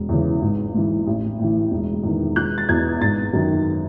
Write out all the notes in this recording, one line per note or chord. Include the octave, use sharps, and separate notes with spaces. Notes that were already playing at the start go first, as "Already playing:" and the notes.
Already playing: E1
E2 C#3 E3
G#1
G#2 E3
A1
A2 E3
E1
E2 D#3
E1 F#6
A6
E2 B2 G#6
G#1 A6
F#2 D#3